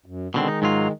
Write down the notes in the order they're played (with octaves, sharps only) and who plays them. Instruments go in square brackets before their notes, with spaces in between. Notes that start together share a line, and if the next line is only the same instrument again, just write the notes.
[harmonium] F#2
[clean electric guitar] B2 D3 C4 [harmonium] D#3 G#3
[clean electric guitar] D#4
G#2 F#3 F4